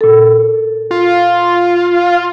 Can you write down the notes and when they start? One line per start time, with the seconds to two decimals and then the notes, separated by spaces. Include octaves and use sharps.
0.01 A#2 A4
0.91 F4